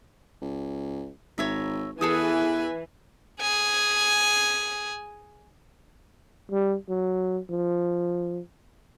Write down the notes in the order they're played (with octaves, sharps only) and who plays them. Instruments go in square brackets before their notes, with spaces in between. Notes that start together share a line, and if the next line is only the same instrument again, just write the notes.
[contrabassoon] C#2
[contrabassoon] G#1 [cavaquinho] C#5 E5 A#5
[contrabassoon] E2 [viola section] E3 [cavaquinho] G#4 A4 D#6 [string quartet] B4 E5 G#5
[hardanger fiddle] G#4 G#5
[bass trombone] G3
F#3
F3